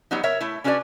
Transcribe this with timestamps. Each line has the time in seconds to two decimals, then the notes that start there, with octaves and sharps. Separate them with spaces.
0.11 F#3 G3 B3 D#4
0.23 A#4 C#5 E5
0.41 A3 E4
0.64 C#4 D4 F#4 B4 C5 D5